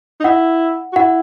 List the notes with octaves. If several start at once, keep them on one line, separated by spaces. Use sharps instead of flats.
D#4
E4 F#5
F#4
E4 F#5